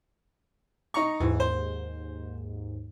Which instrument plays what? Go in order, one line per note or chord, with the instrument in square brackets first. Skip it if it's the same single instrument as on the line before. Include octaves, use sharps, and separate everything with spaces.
[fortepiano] D#4 A#5 C#6
[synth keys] D#2 G#2 [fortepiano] E3
[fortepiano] C5